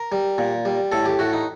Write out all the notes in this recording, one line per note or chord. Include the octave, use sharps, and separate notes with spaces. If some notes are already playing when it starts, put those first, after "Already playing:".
Already playing: A#4
G3
A#2
G3
A2 A4
G4
A2 F#4
D#4